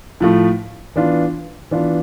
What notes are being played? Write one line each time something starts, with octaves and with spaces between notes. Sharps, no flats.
A2 F3 A3
E3 B3 D4 F4
E3 B3 D4 F4